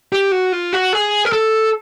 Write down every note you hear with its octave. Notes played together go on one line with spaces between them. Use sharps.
G4
F#4
F4
F#4
G#4
A#4
A4